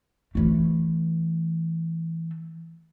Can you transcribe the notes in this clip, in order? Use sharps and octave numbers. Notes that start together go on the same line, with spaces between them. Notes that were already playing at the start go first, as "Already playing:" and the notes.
E3 A3